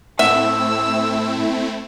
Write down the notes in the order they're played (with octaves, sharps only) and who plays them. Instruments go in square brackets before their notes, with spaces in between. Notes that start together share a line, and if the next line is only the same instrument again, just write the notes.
[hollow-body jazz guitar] A2 F#5 [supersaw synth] A3 C4 E4 [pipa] E5 [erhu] E6